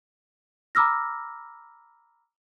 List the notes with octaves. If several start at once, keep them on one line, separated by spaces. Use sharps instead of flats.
A#5 B5 D6 E6 F6 A#6